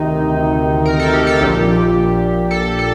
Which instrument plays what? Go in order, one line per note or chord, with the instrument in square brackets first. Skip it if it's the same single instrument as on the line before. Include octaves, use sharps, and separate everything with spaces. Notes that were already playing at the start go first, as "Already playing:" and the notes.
Already playing: [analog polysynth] D2 C3 D#3 D#4
A#4
A4
G4
A4
A#1 A#2 G4
A4
A4